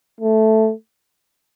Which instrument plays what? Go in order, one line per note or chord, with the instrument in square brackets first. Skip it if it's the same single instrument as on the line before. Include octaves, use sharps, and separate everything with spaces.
[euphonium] A3